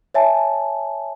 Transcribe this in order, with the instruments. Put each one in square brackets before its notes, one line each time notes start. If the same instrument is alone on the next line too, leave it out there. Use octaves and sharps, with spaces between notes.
[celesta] C#5 E5 G#5 A5